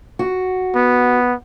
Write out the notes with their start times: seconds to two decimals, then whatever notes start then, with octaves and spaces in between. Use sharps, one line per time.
0.19 F#4
0.75 B3